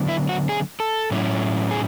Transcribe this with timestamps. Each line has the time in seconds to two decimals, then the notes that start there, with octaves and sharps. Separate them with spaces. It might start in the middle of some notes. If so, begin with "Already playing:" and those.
Already playing: D3 F#3 B3 D4
0.09 E4
0.29 F#4
0.49 G#4
0.80 A4
1.11 A2 F#3 C#4 E4
1.71 G#4